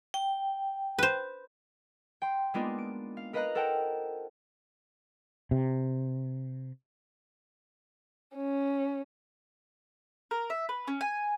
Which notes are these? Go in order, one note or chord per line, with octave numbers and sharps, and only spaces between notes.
G5
B4 C5
G5 C6
G#3 A#3 B3 D4 D#4 F4
D7
F5
A#4 B4 D#5 F5 A#5 F#6
A4 A#4 C5 F#5 G5 A5
C3
C#4
A#4
E5
B4
C#4
G#5